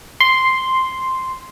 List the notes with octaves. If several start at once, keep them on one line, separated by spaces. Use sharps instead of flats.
C6